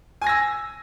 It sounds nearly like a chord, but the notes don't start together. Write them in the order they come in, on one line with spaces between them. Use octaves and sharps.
G#5 G#6 A#6 E6